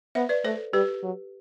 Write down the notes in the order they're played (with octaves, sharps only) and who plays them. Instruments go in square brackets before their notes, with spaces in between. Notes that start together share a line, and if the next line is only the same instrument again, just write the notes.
[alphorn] B3 [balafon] C5 E5
[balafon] B4 D5
[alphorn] A3 [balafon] A4 C5
[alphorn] G3 [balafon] G4 B4
[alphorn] F#3